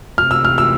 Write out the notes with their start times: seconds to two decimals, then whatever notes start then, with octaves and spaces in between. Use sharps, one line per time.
0.18 C3 E3 A3 F6
0.31 E6
0.45 F6
0.58 E6